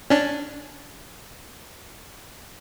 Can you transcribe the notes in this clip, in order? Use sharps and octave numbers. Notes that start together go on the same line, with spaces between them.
C#4 D4